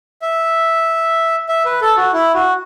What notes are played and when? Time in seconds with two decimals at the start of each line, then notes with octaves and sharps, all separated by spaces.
0.22 E5
1.49 E5
1.65 B4
1.81 A4
1.97 F#4
2.13 E4
2.34 F#4